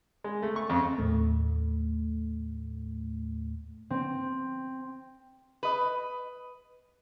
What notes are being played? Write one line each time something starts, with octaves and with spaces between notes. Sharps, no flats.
G#3
A3
C#6
F2
D#2 A2 A3
C4
B4 D#5